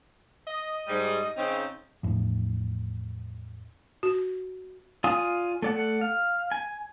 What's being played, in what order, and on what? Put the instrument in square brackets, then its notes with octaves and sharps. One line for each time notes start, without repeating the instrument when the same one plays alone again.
[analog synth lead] D#5
[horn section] G#2 G3
C#3 C4 D#4
[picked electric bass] E2 A2 F3
[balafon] F#4
[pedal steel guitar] F4 D5 F5 G#5 D#6
A3 D5 F#5
F5
G#5